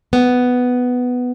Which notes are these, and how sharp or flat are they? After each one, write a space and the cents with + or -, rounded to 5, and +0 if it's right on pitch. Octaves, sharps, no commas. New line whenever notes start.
B3 +5